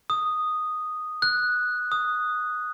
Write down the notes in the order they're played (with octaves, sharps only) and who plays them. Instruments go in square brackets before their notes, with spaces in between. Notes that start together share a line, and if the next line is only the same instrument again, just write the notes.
[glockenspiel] D#6
F#6
D#6